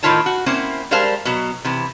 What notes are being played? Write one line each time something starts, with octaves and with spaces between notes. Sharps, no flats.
A2 D#3 E4 F4 C#5 A5
F#4
A#3 C4 C#4 E4 C5
G3 G#3 A#4 C5 F5 A5
B2 F#3
C3 E3